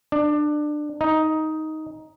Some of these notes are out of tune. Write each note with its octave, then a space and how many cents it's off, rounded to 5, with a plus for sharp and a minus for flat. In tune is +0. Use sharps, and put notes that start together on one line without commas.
D4 +20
D#4 +10